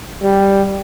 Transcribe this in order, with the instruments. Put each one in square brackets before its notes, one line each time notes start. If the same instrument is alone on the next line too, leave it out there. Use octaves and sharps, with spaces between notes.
[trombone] G3